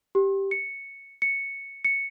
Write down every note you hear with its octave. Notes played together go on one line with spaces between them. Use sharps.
G4
C#7
C#7
C#7